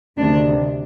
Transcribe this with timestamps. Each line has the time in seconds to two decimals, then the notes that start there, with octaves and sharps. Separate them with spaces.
0.18 D2 C3 D#3 D4